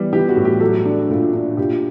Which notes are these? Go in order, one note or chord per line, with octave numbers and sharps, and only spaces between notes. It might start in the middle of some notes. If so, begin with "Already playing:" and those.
Already playing: E3 G3 B3
E3 G4
F#4
A2
G4
F#3 A4
D4
A#2
D4
A#2 G4